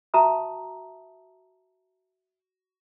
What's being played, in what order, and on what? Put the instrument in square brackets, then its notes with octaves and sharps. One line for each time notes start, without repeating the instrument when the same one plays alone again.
[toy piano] F#4 E5 A5 A#5 D#6